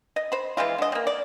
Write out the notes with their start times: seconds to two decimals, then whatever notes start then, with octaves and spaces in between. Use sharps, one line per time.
0.16 D#5
0.32 C5 B5
0.57 E3 F3 G#3 F4
0.78 D3 D#5
0.92 A#3 C4
1.07 D5